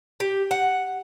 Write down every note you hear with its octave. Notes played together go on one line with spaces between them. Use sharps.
G4
F#5